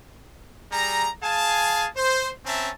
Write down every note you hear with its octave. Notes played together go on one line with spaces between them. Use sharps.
G3 G#4 A#5
G#4 F5 G#5 A5
C5
C4 C#4 E5 A5 A#5